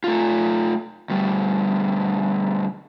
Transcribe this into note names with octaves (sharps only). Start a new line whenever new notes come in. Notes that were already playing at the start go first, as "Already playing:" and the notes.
A3 F4
D2 G3